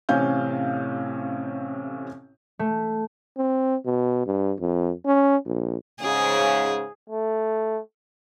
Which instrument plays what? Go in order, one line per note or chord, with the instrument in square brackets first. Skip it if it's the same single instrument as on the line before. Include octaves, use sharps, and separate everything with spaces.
[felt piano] A1 A2 C3 C#4 F5 G6
[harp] A3
[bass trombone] C4
B2
G2
F2
C#4
A#1
[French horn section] G#2 C#3 [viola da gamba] G#4
[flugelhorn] A3